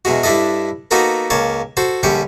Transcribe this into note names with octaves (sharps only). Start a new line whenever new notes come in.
E2 B2 G#3 F#4
G2 D4 E4 A4 D#5
A#3 B3 D#4 F#4 A4 A#4
C#2 A#3 C#5 A5
F#4 A4 C5
A#1 D3 G3 C#4 G5 C#6